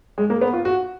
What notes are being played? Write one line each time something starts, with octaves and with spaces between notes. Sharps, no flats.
G#3
A#3
B3
F4
F#4